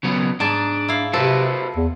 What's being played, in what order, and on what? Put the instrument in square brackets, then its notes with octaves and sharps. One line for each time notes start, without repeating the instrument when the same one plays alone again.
[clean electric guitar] C#3 F#3 B3
[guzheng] G#2 A5 [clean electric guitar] D4
[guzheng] E4 F5
[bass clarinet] C3 [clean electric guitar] F#4 B4 C5 [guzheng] A4
[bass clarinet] E2